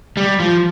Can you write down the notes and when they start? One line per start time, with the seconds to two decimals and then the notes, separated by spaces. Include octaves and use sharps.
0.17 G3
0.40 F3